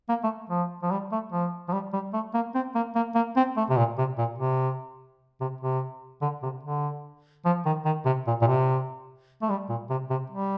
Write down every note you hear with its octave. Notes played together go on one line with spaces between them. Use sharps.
A#3
A3
F3
F3
G3
A3
F3
F3
G3
G3
A3
A#3
C4
A#3
A#3
A#3
C4
A3
C3
A#2
C3
A#2
C3
C3
C3
D3
C3
D3
F3
D#3
D#3
C3
A#2
A#2
C3
A3
G3
A#2
C3
C3
G3